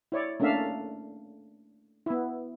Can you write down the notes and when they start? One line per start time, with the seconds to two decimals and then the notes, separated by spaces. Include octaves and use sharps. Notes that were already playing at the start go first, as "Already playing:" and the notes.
0.12 E4 C#5 D5
0.40 A3 A#3 C#4 D4 E5 F5
2.06 B3 E4